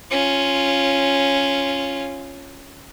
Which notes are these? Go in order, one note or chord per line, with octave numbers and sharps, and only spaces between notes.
C#4 F4